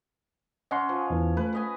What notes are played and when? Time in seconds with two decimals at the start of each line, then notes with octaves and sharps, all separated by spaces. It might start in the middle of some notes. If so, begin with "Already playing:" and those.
0.71 C#4 D#5 F#5 C6
0.89 F3
1.10 E2 E3
1.37 A3 B4
1.53 B4 D#5 G#5